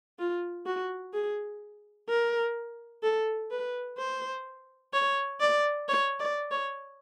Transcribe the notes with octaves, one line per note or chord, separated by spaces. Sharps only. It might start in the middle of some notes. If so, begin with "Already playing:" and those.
F4
F#4
G#4
A#4
A4
B4
C5
C#5
D5
C#5
D5
C#5